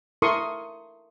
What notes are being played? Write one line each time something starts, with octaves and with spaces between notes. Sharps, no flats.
E4 A4 A#4 C6 C#6 D#6